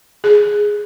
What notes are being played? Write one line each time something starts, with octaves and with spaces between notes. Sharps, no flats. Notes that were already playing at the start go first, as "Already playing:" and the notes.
G#4